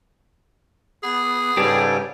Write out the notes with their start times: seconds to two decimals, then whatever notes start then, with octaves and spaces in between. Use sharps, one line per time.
1.03 B3 G#4
1.57 G#2 C#3 G3 G4 A4 B4 G5 G#5